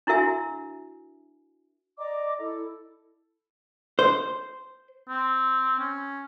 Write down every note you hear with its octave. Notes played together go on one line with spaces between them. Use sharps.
D4 E4 F#4 A#4 E5 G#5
D5 D#5 A#5 D6
E4 A4
C5
C4
C#4